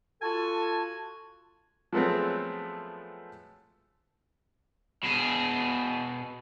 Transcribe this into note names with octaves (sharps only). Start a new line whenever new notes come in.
F4 F#4 A4 G#5 A5
F3 F#3 G#3 A3 B3 C4
B2 G#4